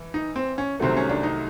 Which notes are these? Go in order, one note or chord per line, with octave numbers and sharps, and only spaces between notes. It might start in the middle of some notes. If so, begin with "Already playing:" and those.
Already playing: E3
D#4
C4
C#4
C2 C3 D#3 F#3 A3 C4
C#4
D4
D#4